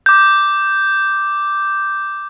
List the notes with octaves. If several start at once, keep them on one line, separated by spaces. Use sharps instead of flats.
D6 G6